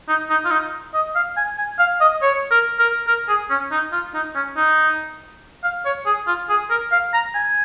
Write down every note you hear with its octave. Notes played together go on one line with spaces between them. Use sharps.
D#4
D#4
F4
D#4
D#5
F5
G#5
G#5
F5
D#5
C#5
A#4
A#4
A#4
G#4
C#4
D#4
F4
D#4
C#4
D#4
F5
C#5
G#4
F4
G#4
A#4
F5
A#5
G#5